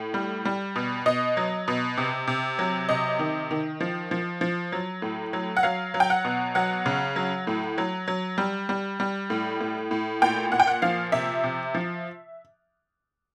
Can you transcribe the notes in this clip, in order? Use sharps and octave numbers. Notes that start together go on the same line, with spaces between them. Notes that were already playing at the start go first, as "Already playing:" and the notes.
Already playing: A2
G3
G3
B2
B2 D#5
F#3
B2
C3
C3
F#3
C3 D#5
D#3
D#3
F3
F3
F3
F#3
A2
F#3
F#5
F#3 F5
F#3
G5
F#5
B2
F#3 F#5
C#3
F#3
A2
F#3
F#3
G3
G3
G3
A2
A2
A2
A#2 G5
A#2 F#5
G5
F#5
F3 F5
C3 E5
C3
F3